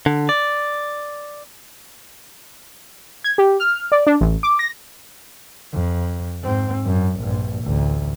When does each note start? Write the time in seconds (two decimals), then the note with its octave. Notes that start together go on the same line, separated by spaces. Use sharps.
0.06 D3
0.29 D5
3.24 G#6
3.38 G4
3.60 F6
3.92 D5
4.06 D4
4.21 A1
4.43 D6
4.59 A#6
5.73 F2
6.43 G#2 C4
6.85 F#2
7.21 A#1 G2
7.63 A1 D2